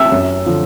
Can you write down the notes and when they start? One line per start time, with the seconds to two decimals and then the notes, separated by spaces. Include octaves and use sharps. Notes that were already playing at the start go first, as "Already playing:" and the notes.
Already playing: E5 E6
0.12 F#2
0.46 D3 F3